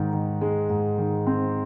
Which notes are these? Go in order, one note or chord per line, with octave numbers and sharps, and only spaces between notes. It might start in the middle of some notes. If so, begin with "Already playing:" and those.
Already playing: G#2 D#3
D#3
G#3
G#2
D#3
C4